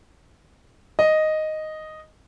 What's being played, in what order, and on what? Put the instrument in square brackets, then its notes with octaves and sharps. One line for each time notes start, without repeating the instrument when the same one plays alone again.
[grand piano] D#5